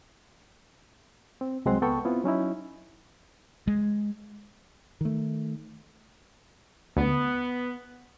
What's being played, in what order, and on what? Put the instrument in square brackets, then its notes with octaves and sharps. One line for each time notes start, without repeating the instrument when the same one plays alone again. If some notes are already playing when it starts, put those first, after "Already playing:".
[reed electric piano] C4
C2 F#3 G#3 C4 F#5 C6
C#2 B3 A4 G5 C#6
B3 C4 E4 F4
F#3 C#4 D#4 E4
[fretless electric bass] G#3
[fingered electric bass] D#3 A3
[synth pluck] D2 [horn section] B3